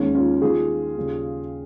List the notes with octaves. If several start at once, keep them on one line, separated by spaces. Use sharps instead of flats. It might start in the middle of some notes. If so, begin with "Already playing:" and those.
Already playing: D#2 D#3 G#3 C#4
C#4 F4
D#2 D#3 G3 F4 G#4
D#2 C#3 G3